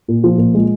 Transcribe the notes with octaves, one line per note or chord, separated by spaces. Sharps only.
A#2
F3
A#2
G#3